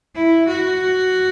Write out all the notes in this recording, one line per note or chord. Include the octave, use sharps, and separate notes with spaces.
E4
F#4